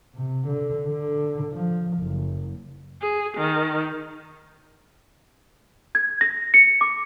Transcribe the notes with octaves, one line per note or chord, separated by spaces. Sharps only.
C3
D3
D3
F3
F#1
G#4
D#3
G#6
A#6
C#7
D6